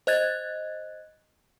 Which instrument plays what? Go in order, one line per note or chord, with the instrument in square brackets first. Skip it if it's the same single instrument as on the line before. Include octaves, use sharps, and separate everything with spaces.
[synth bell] C5 D#5 F#6 G#6 A6